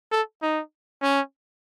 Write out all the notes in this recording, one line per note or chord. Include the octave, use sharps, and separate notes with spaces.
A4
D#4
C#4